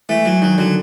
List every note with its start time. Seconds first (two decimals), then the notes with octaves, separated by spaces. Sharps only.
0.09 E3 A3
0.25 E3 F#3
0.42 D#3 F#3
0.58 D3 F#3